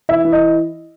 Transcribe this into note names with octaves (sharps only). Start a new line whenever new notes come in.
E3 E5
E3
D#5